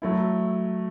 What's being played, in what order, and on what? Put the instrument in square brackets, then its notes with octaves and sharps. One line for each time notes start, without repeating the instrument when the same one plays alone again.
[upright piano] F#3 A3 E4